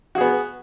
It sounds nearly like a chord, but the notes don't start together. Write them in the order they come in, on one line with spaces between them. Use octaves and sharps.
F#4 G#4 B3